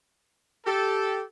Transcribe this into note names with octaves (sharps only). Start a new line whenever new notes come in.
G4 A4